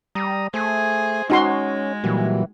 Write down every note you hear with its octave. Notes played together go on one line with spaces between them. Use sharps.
G3 A#5 D#6
A3 G#4 C5
G#3 C#4 D#4 F#4 C6
A#2 E3 F#3 G3